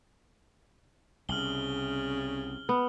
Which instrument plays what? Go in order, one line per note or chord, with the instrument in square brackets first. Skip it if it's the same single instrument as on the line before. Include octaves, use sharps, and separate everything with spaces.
[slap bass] C2 [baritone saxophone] C#3 [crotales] F6 F#7 G7
[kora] B3